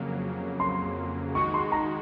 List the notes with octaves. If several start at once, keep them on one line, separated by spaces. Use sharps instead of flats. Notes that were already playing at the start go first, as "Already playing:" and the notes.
Already playing: F2 C#3 F#3 A#3
C6
D#3 G#3 D#4 F#4 C#6
C6
A#5